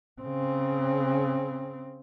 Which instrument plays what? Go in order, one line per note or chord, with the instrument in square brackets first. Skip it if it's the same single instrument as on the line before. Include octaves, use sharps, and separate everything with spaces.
[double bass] C#3 C4